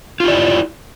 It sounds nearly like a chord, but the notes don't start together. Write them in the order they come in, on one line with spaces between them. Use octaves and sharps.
F4 G4 D5 E4